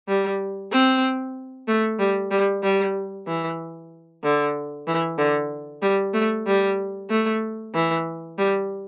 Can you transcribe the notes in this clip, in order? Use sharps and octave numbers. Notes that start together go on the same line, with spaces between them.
G3
C4
A3
G3
G3
G3
E3
D3
E3
D3
G3
A3
G3
A3
E3
G3